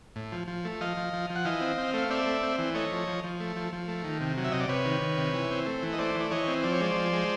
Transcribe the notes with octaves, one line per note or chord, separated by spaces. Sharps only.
A2
F3
F3
A3
F3 D#5 F5
F3
F3
F3
F#5
E3 D#5 F5
C4
C4
A3 F5
C4 D5 E5
A3
C4
E3
A3 C#5 D#5
F3
F3
F3
A3
F3
F3
A3
D#3
C3
F#3
E5
C3 D#5
D5
C3 B4 C#5
D#3
D#3
C3
E3
C4
A3
E3
D#5
A3 C5 D5
E3
D5
E3 C#5 D#5
C4
F3 D5
C#5
G#3 C5 D5
F3
G#3